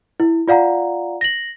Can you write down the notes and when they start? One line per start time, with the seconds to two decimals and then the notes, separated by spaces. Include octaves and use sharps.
0.20 E4
0.48 F4 D5 F5 F#5 A#5
1.21 A#6 F#7